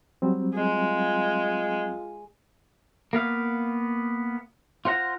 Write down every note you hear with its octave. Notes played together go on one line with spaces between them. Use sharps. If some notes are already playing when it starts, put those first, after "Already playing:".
F#3 G3 C4
G#3 F4
A#3 B3 F5
F4 C5 F#5 A#5